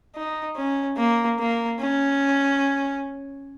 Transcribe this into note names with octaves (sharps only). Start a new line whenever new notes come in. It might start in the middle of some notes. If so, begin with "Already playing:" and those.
D#4
C#4
A#3
A#3
C#4